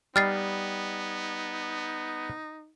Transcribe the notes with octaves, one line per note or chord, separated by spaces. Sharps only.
G3 B3 D#4 D#5 F6 A6 C7